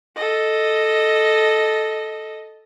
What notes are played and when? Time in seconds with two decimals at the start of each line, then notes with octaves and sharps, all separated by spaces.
0.16 A4 D#5